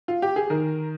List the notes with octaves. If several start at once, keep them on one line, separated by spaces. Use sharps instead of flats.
F4
G4
G#4
D#3 A#4